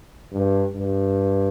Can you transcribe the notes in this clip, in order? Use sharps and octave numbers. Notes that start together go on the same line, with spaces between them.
G2
G2